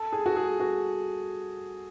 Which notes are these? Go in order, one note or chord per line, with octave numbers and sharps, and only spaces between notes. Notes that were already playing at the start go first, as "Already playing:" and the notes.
Already playing: A4
G#4
F#4
G#4
F#4